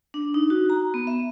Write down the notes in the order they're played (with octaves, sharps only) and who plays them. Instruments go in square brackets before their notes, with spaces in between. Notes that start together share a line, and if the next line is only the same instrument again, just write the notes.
[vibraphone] D4
D#4
F#4
A#5
B3
E5